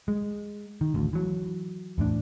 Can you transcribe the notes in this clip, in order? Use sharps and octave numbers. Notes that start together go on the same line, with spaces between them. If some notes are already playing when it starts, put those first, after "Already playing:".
G#3
D#3
A1 D2
E3 F#3
E2 A2 D4